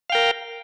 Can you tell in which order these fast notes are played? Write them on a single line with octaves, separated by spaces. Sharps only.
F5 G5 A#4